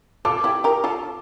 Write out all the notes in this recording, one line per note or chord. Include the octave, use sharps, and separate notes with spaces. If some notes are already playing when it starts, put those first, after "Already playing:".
F4 A4 D6
E4 G4
G4 A#4
F4 A4